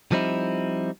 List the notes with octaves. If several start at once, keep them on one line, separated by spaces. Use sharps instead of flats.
F3 G3 C4 D#4 E4